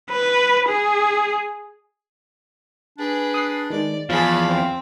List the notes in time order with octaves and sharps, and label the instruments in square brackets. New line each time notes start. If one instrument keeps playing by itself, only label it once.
[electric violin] B4
G#4
[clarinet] D4 [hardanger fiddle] G#4 B4
[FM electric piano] D#6 F#6 C7
[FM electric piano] D#3 G#3 [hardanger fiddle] D5
[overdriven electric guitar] E2 [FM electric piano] F3 G#4 [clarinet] F5 [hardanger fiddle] A5 B5
[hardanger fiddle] C4